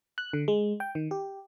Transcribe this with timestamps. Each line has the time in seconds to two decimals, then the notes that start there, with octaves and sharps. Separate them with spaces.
0.18 F#6
0.33 D3
0.48 G#3
0.80 G5
0.95 D#3
1.11 G4